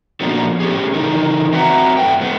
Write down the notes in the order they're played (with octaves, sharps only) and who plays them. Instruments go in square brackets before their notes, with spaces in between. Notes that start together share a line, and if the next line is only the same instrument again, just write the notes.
[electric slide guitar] A#2 F3 A#3 B3 D4 F#4
A2 C#4 G4 G#4
C#3 E3 D#4 A#4
C4 F#4 B4 E5 F#5 A#5
F#2 A3 G5
G#3 B3